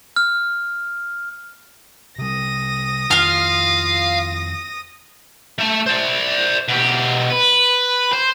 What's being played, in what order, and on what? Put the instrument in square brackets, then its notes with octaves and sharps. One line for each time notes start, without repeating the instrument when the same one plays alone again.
[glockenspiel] F6
[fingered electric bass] C3 G3 [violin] D#6 A#6
[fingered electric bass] F2 D#3 [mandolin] F4 F6 [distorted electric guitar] F5
[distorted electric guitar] A3 A5
C5 D5
B2 G4
B4
C5